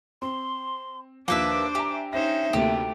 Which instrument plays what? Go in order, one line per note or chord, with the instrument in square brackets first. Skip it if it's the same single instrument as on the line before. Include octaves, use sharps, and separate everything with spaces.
[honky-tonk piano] C4 [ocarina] C6
[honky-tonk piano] D#2 F3 [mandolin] A#3 B4 E5 [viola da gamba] D4 C5 [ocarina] D6
[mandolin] G4 [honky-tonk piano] E5 G#5 A#5
[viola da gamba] C#4 D#4 C5 [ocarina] E5 [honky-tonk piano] A#6 E7
[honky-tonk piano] D2 C3 A#3 [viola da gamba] A3 [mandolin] G4